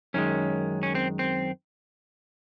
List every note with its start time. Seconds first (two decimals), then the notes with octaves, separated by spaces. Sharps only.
0.14 F#2 D#3 G#3 C#4
0.83 C#4
0.95 C4
1.19 C4